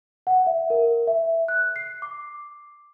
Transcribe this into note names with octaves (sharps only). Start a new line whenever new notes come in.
F#5
E5
A#4
E5
F#6
C7
D6